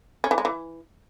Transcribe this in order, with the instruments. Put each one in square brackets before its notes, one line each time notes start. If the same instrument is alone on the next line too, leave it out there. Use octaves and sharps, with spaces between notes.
[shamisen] C#4
E3
G#3
E3